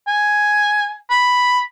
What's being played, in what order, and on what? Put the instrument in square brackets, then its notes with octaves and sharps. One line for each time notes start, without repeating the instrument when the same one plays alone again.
[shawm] G#5
B5